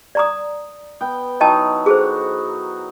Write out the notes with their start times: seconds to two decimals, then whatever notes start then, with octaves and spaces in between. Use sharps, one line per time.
0.15 D5 A#5 D#6
1.01 B3 G5
1.41 F#3 D#4 E4 D#5 G5 A5
1.86 F#4 G#4 A4 C5